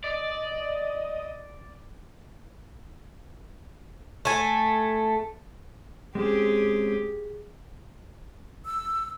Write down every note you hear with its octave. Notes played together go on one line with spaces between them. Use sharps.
D5 D#5
A3 G#5
G#3 C4 C#4 G4 G#4
E6